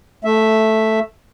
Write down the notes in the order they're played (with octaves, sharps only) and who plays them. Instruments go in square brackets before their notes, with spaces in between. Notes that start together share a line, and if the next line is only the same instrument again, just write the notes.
[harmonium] A3 E5